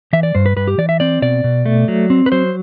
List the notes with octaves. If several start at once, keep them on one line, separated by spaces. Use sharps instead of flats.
E3 E5
D5
G2 C5
B4
G2 B4
G4
E3 D5
E5
C4 D5
B2 D5
B2
A3
F#3
C4
B4
F#3 C5